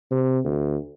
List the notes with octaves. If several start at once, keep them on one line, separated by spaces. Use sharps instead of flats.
C3
D2